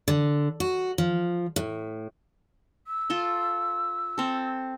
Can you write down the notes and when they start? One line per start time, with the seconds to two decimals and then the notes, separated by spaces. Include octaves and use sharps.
0.08 D3
0.60 F#4
0.98 F3
1.56 A2
2.87 E6
3.10 F4 A4 C6
4.18 C4 A4